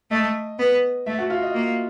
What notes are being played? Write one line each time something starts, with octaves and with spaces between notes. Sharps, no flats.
A3 D#5
B3
A3 E5
F#4 F#5
F4 F5
D#5
A#3